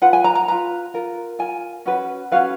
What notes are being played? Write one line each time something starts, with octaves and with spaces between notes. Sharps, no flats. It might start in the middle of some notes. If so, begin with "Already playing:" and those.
F4 B4 F#5
G#5
A#5
A#5
F4 B4 A#5
F4 A#4
F4 A#4 G#5
C#4 F#4 B4
C#4 F#4 B4 F5